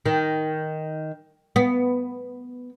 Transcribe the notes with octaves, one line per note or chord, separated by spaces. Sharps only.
D#3
B3